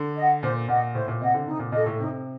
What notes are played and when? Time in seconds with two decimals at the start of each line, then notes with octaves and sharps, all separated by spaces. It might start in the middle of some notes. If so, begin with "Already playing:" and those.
Already playing: D3
0.17 D#5 F#5
0.42 A#2 C5
0.68 A#2 D#5 F#5
0.95 A2 C5
1.08 A#2
1.20 C3 D#5 F#5
1.34 D3
1.46 C3 D#4
1.59 A#2
1.72 A#2 A4 D#5
1.86 A2
1.99 C3 D#4